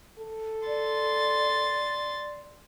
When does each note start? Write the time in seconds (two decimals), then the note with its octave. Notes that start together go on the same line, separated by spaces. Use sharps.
0.19 A4
0.67 D5 C6 A6